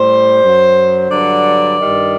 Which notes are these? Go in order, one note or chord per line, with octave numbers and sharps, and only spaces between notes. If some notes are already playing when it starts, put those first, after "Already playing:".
Already playing: A2 G3 C5
F#2 F#3
G2 D3 F#3 D5
G2 D#3 G3